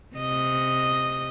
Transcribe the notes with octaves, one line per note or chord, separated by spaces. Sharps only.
C3 D#5